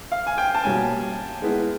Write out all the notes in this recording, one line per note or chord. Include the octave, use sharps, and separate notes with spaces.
F5
G#5
G5
A5
B2 G3 A#3 C#4 G#5
G#3 B3 E4